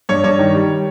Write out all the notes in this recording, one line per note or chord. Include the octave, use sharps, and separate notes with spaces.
G2 C#5
G2 C#5
D#3
G3